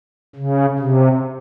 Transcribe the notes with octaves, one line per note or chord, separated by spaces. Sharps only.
C#3
C3